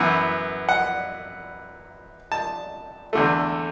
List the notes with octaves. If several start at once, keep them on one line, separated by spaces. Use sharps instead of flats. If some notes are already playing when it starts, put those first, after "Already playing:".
Already playing: F#2 E3 B3 F#5
F#5
A5
E2 D3 A3